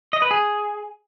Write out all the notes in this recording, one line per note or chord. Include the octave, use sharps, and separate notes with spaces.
D#5
B4
G#4